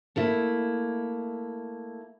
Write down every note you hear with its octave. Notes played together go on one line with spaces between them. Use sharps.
A3 A#3 E4